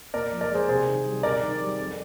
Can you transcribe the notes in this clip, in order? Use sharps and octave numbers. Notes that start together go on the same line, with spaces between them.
A#2 A#4 D5
F3
A#4 D5
G#3 G#4 C5
C3 G#4 C5
D#3
G3
C3 A#4 D5
D#3
G3
F2